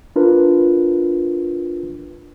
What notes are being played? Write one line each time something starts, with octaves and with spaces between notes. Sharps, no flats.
D4 F4 A#4 B4